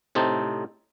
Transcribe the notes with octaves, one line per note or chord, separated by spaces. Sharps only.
A2 C3 C4 D#4 A5